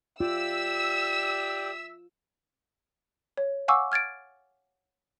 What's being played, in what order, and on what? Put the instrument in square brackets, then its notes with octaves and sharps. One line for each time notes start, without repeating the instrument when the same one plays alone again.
[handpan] F4 [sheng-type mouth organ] G4 D5 [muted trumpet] E5 [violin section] E6
[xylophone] C#5
F5 F#5 G#5 C#6 D6 E6
F6 G#6 A6 D7